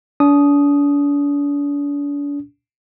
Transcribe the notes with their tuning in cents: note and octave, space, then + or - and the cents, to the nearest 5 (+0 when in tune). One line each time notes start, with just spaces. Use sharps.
D4 -40 D#6 +0